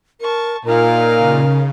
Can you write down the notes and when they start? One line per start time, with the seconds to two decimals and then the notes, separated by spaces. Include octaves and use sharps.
0.20 A#4 A5 C#6
0.65 A#2 D#4 A#4 F5
1.16 C#3